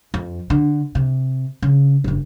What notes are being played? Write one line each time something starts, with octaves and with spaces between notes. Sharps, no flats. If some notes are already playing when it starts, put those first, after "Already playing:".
F2
D3
C3
C#3
F#1 G2